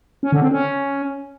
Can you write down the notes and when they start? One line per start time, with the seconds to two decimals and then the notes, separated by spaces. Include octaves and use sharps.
0.23 C#4
0.32 D3
0.42 C4
0.51 C#4